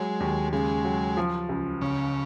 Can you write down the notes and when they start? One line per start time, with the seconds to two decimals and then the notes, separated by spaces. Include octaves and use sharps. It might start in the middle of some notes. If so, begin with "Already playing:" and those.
Already playing: F#3 G#3
0.20 D#2
0.53 C#3 G#3
0.85 F#3
1.17 F3
1.49 C#2
1.81 C#3 C#4